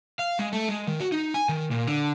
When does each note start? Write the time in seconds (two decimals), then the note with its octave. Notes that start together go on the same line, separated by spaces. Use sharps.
0.19 F5
0.39 G#3
0.53 A3
0.69 G#3
0.87 D#3
0.99 F#4
1.12 D#4
1.34 G#5
1.49 D#3
1.71 A#2
1.87 D3